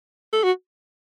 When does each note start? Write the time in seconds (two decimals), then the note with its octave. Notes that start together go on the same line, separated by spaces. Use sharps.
0.33 A4
0.44 F#4